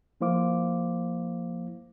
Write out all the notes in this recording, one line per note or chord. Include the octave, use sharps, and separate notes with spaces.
F3 A#3 E4 C5 F5 D6